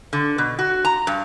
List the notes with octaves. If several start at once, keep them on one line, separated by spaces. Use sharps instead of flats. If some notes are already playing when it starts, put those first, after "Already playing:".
D3
B2
F#4
A#5
G2